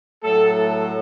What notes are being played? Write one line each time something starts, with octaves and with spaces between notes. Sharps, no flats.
A2 F#3 A3 A4